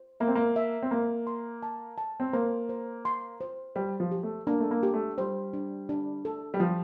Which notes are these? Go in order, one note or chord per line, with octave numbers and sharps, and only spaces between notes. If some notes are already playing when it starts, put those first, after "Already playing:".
Already playing: C5
A#3 E5
C4
A#3
E5
C4
A#3 A#4
C6
A5
A5
C4
A#3 C5
C5
C6
C5
G3 C5
F3
G4
A3
A#3 D4
A3
A#3
G4
A3
G3 C5
D4
D4
A4
G3
F3 G5